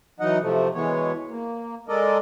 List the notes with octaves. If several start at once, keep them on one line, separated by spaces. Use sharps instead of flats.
E3 F#3 D#4 D#5 F#5
C3 F3 A3
B2 E3 G#3 B3 C#5
A#3
G#3 A4 A#4 D5 D#5